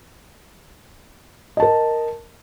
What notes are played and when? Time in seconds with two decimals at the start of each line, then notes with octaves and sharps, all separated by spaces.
1.57 D#5
1.60 A5
1.62 A#4